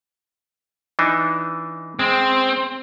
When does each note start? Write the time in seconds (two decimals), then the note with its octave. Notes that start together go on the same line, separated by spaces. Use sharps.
0.99 E3 D4 D#4
1.99 G#3 C4